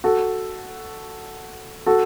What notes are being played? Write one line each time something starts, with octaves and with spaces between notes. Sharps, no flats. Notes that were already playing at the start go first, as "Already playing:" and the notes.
F#4 A4
F#4 A4